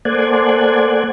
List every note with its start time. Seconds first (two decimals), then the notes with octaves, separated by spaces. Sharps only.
0.05 A#3 A4 C5 D5 F#5 G#5